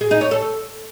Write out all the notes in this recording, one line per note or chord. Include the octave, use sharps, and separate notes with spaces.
G#4
D#4
C#5
A4